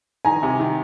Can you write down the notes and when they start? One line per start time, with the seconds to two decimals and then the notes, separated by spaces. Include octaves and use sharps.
0.25 D#3 G#5 A#5
0.43 C3
0.60 D#3